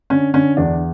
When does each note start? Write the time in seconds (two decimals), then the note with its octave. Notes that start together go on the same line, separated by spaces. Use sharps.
0.10 D3 C#4
0.34 D3 C#4
0.57 E2 D4